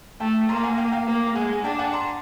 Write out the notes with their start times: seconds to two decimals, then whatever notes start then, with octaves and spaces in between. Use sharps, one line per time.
0.20 A3 G5 A5
0.49 A#3 A#5 C6
0.63 F#5 G#5
0.78 F5 G5
0.92 F5 G5
1.07 A#3
1.35 G#3 F#5 G#5
1.53 G#5
1.64 D4 G5 A5
1.79 F#5 G#5
1.93 A#5 C6